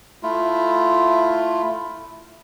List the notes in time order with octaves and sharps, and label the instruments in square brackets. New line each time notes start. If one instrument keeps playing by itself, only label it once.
[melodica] A3 E4 F4